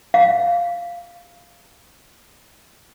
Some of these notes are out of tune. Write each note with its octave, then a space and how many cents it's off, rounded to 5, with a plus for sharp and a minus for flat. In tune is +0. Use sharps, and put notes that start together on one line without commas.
F5 -5